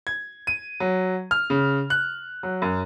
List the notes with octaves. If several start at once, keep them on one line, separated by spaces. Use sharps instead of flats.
G#6
D#7
F#3
F6
C#3
F#6
F#3
F#2